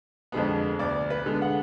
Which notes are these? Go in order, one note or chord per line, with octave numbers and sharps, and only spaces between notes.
F2 D3 G#3 B3
D2 D5
B4
D3 G#3 B3
F#5